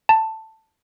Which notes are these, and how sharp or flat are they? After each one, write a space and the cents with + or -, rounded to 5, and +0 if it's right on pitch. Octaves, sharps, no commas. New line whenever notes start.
A5 +10